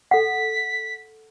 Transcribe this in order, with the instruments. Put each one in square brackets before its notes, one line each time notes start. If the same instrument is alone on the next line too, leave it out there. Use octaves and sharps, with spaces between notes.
[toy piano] A4 F#5 [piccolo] B6